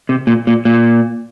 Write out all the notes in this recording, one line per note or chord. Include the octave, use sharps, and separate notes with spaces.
C3
A#2
A#2
A#2